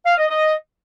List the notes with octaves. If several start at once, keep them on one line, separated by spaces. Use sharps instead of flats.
F5
D#5
D#5